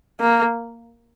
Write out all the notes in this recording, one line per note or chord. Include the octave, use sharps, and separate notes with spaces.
A#3